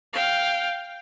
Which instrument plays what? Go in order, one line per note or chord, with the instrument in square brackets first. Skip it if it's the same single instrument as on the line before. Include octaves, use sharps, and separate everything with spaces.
[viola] F5 G5